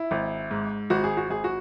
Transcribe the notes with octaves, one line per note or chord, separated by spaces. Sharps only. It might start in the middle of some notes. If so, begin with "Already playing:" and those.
Already playing: E4
G#1
G#2
G#1 F#4
G#4
F#4
G#1 G#4
F#4